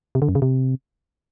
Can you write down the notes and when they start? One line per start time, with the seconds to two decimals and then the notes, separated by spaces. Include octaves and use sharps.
0.15 C3
0.22 D3
0.29 F#2
0.35 C#3
0.42 C3